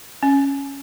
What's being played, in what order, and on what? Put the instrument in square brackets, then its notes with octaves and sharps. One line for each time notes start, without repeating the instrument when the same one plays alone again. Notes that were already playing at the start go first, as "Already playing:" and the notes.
[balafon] C#4